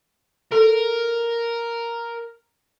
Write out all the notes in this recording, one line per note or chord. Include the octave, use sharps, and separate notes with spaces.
A4 A#4